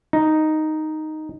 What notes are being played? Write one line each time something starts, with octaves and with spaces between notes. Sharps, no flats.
D#4